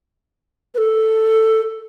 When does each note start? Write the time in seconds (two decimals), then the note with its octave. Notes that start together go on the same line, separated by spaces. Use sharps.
0.75 B4
0.78 A4